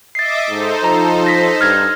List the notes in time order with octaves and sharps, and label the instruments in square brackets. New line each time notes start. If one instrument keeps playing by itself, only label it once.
[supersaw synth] D#5 E5 D6 [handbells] A6 C7
[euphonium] G#2 [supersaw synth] D#4 A4 C5
[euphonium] F3 [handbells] A#5
[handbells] A#6 B6
[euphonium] G2 [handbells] F6 G#6 A#6